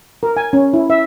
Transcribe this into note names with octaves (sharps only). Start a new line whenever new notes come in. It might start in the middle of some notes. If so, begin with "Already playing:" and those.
A#4
G#5
C#4
E4
E5